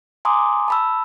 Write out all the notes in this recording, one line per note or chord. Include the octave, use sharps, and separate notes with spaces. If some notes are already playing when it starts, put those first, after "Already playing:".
G#5 A#5 C6 D6 D#6
A5 B5 E6